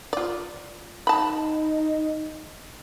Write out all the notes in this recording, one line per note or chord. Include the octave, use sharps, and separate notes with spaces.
F4 D5
D#4 A5 B5